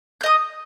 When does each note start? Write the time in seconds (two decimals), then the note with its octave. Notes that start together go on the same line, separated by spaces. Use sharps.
0.21 G6
0.23 D#5
0.26 D#6